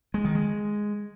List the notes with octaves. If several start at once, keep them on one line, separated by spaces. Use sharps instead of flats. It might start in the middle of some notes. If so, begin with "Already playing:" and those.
G#3
D#3
G#3